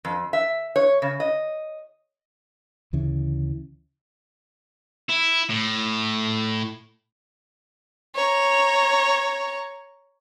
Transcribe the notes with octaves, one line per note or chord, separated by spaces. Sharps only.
F2
E5
C#5
C#3
D#5
D2 C#3 E3
E4
A2
C#5 A#5